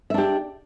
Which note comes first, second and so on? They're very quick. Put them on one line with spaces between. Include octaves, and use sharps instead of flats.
E5 D4 G4